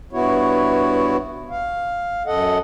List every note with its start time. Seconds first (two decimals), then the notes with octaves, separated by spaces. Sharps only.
0.13 G2 B3 E4 F#4 C#5
1.50 F5
2.26 F#2 A4 D#5 F#5